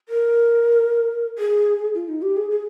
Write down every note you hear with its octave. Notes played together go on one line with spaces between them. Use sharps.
A#4
G#4
F4
D#4
G4
G#4
G#4